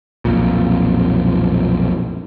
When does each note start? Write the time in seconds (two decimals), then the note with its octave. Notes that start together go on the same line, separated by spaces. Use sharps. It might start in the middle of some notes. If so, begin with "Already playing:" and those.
0.25 B1 F2 A#2